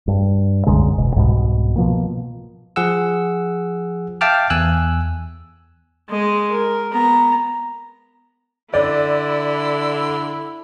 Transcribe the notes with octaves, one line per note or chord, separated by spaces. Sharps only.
G2
C2 F#2 D3 G#3
E1 B2
C2 G#2 B2
B2 F3 A#3
F3 G#4 F#5 E6
E5 F5 G5 A5 D6 F6
E2 G#5 E6 F#6
G#3 D#5
A#4
B3 A#5
D3 E4 D5